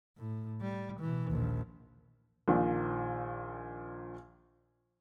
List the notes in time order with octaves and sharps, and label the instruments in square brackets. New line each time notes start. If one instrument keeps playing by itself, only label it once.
[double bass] A2
G3
B2 E3
A#1 D#2
[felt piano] A#1 A#2 D#3